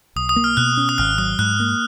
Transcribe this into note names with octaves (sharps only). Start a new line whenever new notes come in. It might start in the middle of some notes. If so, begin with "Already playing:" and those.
B1 D#6
D#6
A#3
F6
B2 F#6
C#4
D#6
G#1 F6
F#3 D#6
G#2 F#6
A#3